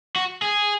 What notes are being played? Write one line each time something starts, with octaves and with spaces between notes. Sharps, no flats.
F#4
G#4